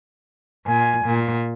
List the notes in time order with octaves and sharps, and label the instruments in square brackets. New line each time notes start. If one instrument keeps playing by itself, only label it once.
[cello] A#2 [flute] G#5
[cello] A#2